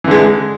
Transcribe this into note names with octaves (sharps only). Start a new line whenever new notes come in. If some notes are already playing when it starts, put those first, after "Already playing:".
D3 E3 G#3